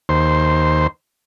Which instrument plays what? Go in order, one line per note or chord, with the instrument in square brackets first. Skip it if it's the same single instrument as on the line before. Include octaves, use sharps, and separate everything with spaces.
[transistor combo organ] D#2 C5